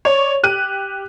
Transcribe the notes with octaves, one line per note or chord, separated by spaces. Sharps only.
C#5 D5
G4 F#6 D#7